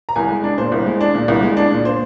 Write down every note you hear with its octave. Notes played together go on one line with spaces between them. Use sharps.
A#5
C2 G#5
G#3
D4
A#2 C5
C2
G#3
D4
A#2
C2
G#3
D4
A#2
C5